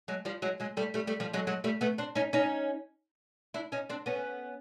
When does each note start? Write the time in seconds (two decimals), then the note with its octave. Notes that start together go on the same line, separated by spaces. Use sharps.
0.08 F#3 G#3
0.25 F3 G3
0.42 F#3 G#3
0.60 F#3 G#3
0.77 G3 A3
0.94 G3 A3
1.07 G3 A3
1.20 F3 G3
1.34 F#3 G#3
1.47 F#3 G#3
1.64 G3 A3
1.81 A3 B3
1.98 C4 D4
2.15 C#4 D#4
2.33 C#4 D#4
3.54 D4 E4
3.72 C#4 D#4
3.90 C4 D4
4.06 B3 C#4